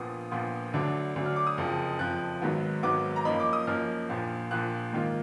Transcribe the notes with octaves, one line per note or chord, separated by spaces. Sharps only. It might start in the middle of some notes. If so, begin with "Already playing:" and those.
Already playing: A#1 A#2 F3 B3 F4 D#6
A#1 A#2 F3 B3 F4
D2 D3 F#3 D4
D2 D3 F#3 D4
F6
D6
D#6
F#1 F2 F3
F#1 F2 F3 F#6
G#1 G#2 D#3 F#3 B3
G#1 G#2 D#3 F#3 B3 D6
A#5
F#2 F3 A#3 D#4 B5
D6
D#6
F#2 F3 A#3 D#4 F6
A#1 A#2 F3
A#1 A#2 F3 F#6
G#2 D#3 A#3 F4